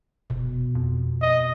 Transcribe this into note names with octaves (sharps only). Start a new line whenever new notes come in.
F1 B2
F2
D#5